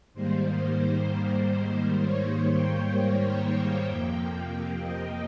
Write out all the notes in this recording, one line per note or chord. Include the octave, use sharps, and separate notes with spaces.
G#2 D#3 G3 A#3 C5
C#5
G5
G5
F2 C3 F3 A#3
D#5